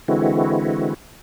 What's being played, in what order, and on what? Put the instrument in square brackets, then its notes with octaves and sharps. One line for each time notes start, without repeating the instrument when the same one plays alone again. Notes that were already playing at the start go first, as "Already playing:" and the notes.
[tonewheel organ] D3 E3 G#3 C4 E4 F#4